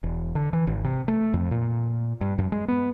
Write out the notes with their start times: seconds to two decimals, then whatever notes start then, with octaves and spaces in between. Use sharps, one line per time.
0.03 E1
0.35 D3
0.53 E3
0.67 G#1
0.84 C3
1.08 A3
1.34 F2
1.51 A#2
2.21 G2
2.38 F#2
2.52 G#3
2.68 B3